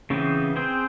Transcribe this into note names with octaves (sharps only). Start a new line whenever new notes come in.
C#3 E3 B3 C4
C4 G#4 C5 G5